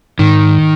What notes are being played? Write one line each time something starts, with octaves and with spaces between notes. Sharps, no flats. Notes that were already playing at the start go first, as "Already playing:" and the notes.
G#2 D#3